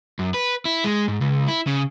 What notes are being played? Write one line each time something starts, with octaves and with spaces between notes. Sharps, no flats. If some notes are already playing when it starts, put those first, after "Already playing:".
F#2
B4
E4
G#3
G#2
C#2
E4
C#3